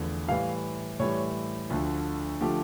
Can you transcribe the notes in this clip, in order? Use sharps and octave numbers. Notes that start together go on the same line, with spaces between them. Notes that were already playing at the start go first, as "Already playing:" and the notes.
Already playing: E2 D3 F3 A3
A2 E3 G3 F5
A2 E3 G3 C#5
D2 D3 F3 A3
D3 F3 A3 G4